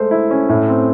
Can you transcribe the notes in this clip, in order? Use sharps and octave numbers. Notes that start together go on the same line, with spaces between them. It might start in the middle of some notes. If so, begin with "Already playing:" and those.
Already playing: G#3 A3 C5
E4
C#4
A2
C4